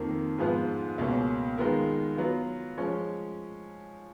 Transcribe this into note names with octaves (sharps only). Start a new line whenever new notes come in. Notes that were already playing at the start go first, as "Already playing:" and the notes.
Already playing: F2 D#3 A#3
G#2 F3 B3 F4
C#2 B2 A#3 C#4
D#3 G#3 B3 F4 A#4
F#3 B3 F4
F3 G#3 C#4